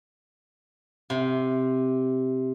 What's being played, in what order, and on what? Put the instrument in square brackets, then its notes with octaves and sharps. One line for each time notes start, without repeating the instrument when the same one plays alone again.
[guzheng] C3